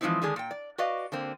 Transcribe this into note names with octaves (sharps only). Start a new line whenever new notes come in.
E3 F3 G#3 C4 D#4 E4
D3 D#3 G#3 D4 G#4
A#2 G5
D5
F#4 B4 D5 D#5 F5
D3 A#3 C4